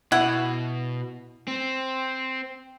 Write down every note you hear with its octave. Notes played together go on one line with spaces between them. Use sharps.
B2 E4 F#5
C4